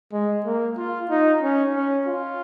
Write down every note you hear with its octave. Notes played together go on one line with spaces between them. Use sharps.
G#3
A#3
F4
D#4
C#4
C#4
F4